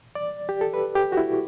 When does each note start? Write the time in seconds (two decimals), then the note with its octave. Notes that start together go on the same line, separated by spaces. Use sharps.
0.15 D5
0.49 G4
0.61 A4
0.74 B4
0.95 G4
1.12 F#4
1.17 E4